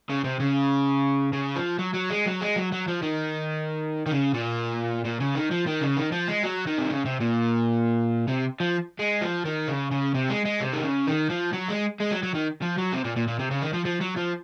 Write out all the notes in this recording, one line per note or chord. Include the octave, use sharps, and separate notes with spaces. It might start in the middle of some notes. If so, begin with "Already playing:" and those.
C#3
C3
C#3
C#3
F3
F#3
F#3
G#3
F#3
G#3
F#3
F#3
F3
D#3
D#3
C#3
A#2
A#2
C#3
D#3
F3
D#3
C#3
D#3
F3
G#3
F#3
D#3
C3
C#3
C3
A#2
C3
F3
G#3
F3
D#3
C#3
C#3
C3
G#3
G#3
C3
D#3
C#3
D#3
F3
F#3
G#3
G#3
F#3
F#3
D#3
F3
F#3
C3
A#2
A#2
A#2
C3
C#3
D#3
F3
F3
F#3
F3